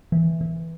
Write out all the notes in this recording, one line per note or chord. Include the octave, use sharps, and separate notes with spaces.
E3
E3